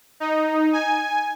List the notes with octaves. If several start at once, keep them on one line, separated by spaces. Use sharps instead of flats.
D#4
G#5